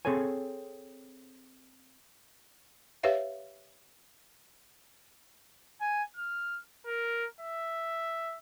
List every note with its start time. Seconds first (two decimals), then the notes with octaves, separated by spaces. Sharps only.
0.05 C4 G#4 A4 C#5 G#5
3.03 G4 B4 C#5 E5 F5
5.81 G#5
6.17 F6
6.86 A#4
7.40 E5